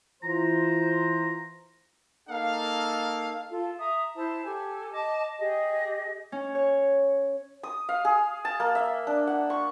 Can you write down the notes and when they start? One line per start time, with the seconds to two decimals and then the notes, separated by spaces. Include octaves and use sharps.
0.23 E3 F4 C5 A#5
2.28 A#3 D#4 A4 F5
3.50 F4 A4
3.79 E5 A#5 D#6
4.16 E4 C5 A5
4.45 G4 A4 G#5
4.91 D#5 A5 D6
5.38 G4 G#4 D#5
6.32 C#4
6.55 C#5
7.63 D#6
7.89 F5
8.05 G#4
8.45 A5
8.60 A#3
8.75 E5
9.07 D4
9.27 F#5
9.50 C#6